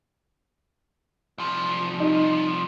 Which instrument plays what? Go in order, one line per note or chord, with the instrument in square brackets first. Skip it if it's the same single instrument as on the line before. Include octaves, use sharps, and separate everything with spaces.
[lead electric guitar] C2 F3
[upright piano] D#4